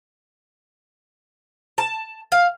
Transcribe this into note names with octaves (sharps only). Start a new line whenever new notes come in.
A5
F5